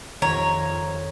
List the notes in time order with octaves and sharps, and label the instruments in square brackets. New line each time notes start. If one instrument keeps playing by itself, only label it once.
[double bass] F2 [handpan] D#3 [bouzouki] C#5 [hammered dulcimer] A#5